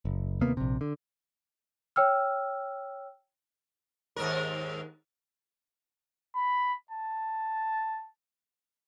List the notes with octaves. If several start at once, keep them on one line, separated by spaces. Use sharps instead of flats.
F#1
D#2 C3 A#3 B3
A#1 C3
D3
C#5 G5 E6 F6
D#2 G#2 A#4
B5
A5